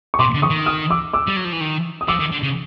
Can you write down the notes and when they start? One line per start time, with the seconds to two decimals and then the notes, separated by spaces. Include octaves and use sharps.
0.14 C#6
0.19 B2 C6 D6
0.34 D3
0.42 C#6 D#6
0.50 D#3
0.66 D#6 F6
0.90 D6 E6
1.13 D6 E6
1.27 G3
1.37 F#3
1.45 F3
1.52 E3
1.61 D#3
2.01 D#6
2.08 F3 D6 E6
2.19 D#3
2.32 D3
2.43 C#3